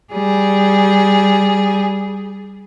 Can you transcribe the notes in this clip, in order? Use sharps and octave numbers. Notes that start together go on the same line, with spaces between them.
G3 G#4